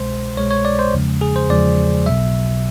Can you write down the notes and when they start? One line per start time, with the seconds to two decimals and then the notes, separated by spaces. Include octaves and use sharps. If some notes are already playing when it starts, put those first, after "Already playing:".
Already playing: C2 B2 G#3 C5
0.37 C2 B2 G#3 C#5
0.51 C#5
0.65 D5
0.79 C5
0.93 E2 C#3 F3 G#3
1.21 G#4
1.36 C5
1.50 E2 C#3 F3 G#3 D5
2.06 B1 B2 F#3 E5